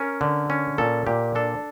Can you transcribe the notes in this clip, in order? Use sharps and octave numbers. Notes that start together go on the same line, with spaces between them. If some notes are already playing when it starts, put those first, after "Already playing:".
Already playing: C#4 A#4
D3
C#4
A#2 A4
A#2 G4
D4 A4